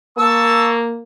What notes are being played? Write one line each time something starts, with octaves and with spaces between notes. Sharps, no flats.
A#3 A5 C#6 E6